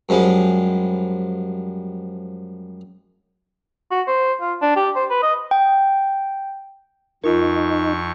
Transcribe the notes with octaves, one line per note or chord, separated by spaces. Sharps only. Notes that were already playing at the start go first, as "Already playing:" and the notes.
F#2 F3 G3 G#3
F#4
C5
F4
D4
G4
C5
B4
D#5
G5
F2 D#4 F4 A#4 C#6